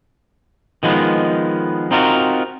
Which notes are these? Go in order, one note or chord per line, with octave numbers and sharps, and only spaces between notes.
D#3 F3 G#3 B3
C4 D#4 F4 F#4 A#4